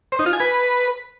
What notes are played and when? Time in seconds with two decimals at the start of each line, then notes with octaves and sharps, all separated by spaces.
0.12 C5
0.19 D#4
0.26 F4
0.33 G#5
0.40 B4